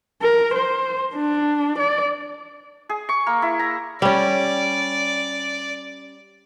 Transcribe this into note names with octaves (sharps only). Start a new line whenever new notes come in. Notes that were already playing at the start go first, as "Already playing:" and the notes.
A#4
C5
D4
D5
G#4
C#6
A#3
E4
A#5
G3 C#4 D5